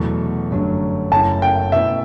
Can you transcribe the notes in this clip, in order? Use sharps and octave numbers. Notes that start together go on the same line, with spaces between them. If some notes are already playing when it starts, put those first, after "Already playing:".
Already playing: E2 B2 F#3 A3
G1 F#2 F#3 A3 D4
F#1 F#2 F#3 A3 E4 A5
G5
B2 A3 E4 A4 E5